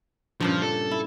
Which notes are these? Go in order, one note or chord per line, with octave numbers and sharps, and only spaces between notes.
G2 A#2 C#3 F3
A4
E4